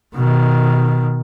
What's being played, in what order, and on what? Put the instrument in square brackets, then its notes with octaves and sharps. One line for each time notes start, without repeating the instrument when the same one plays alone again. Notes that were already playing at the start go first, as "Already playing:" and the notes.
[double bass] B2 D#3